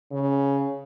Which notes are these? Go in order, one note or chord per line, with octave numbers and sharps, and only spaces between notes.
C#3